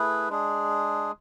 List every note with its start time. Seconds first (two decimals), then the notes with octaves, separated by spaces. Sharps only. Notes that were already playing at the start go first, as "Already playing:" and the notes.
Already playing: A3 E4 G#4 B4
0.29 G#3 D4 G#4